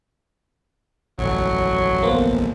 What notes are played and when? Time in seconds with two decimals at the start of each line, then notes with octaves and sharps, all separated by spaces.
1.19 A1 F#3
2.03 A#3 B3 C5